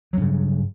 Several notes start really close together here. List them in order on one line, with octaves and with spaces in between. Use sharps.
F#3 G2 C#3